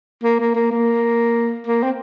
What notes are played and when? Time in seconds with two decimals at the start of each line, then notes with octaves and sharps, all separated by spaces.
0.23 A#3
0.40 A#3
0.55 A#3
0.71 A#3
1.67 A#3
1.83 C4